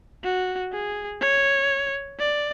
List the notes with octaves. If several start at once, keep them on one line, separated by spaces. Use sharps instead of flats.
F#4
G#4
C#5
D5